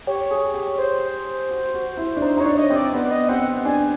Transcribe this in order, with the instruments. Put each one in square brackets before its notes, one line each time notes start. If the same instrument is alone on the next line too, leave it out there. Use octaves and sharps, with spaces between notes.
[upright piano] G4 [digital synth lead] C#5
[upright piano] G#4
G4
[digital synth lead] C5
[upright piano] F#4
F#4
E4
D4
[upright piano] D#4 [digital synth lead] C5
[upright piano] D#4 [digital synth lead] C#5
[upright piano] D4
[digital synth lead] D#5
[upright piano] C4
[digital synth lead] D5
[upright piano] B3 [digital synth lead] D5
[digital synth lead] D#5
[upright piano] C4 [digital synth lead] F#5
[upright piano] D4 [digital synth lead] G#5